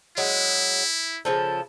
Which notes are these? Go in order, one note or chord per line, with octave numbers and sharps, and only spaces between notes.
F#3 G#3 E4
C#3 F3 A4